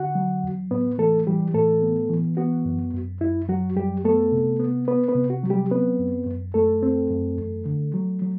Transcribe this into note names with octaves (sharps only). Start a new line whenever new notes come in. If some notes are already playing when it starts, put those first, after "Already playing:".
Already playing: D3 F#4 F#5
F#3
E2
A2 B3 B4
E3 A3 A4
E3 G3 G4
A2 A3 A4
B3
E3
B3 F#4
F#2
F#2
F#2 E4
F#3 F#4
F#2 G3 G4
A3 B3 A4
C3
B3
B3 B4
B3 B4
C3
F#4
F#3
G3 G4
B3 C4 B4
F#2
F#2
F#2 A3 A4
C4
F#2
E2
D3
F#3
F#3